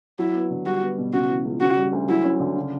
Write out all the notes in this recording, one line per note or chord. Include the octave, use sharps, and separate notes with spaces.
F#3 E4
B3
D3
G3 F#4
B3
B2
C#3 F#4
E3
C#2
C#3 F#4
G3
D2
F#3 E4
C#4
D3
C#3